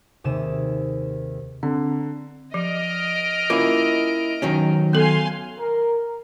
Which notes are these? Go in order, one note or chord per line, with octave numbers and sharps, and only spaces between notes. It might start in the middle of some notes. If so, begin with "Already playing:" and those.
D#2 C3 G#4 E7
D3 C4
F3 D#5 F6 D7
A#3 C#4 E4 F4
D#3 F#3 C#4
B3 A4 F5 G#5 C6
A#4